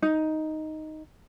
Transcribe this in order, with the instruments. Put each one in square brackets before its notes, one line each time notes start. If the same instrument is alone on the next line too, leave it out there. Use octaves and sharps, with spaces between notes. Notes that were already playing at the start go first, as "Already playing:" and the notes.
[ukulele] D#4